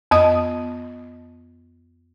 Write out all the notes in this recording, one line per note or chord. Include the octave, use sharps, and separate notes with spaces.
F2 B3 D#5 D#6